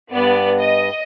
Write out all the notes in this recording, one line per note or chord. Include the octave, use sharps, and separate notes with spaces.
G2 B3 D5
D#5